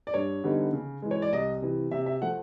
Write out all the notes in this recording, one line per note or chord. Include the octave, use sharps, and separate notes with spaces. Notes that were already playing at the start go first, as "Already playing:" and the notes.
D5
G2 C#5
D3 G3 B3 D#4
C#3
E3 G#3
C#5
D5
C2 D#5
C3 E3
C3 E5
E5
F3 A3 F#5